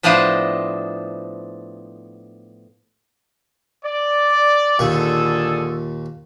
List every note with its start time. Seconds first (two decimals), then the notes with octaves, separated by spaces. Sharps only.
0.03 A2 F3 B3 D4 C5 D#5
3.84 D5
4.79 D#2 A#2 D3 G#4 A4 C#6